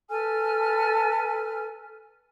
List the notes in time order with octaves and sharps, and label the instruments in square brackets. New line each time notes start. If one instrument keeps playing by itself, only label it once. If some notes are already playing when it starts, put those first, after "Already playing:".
[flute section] A4 B4 G#5 F6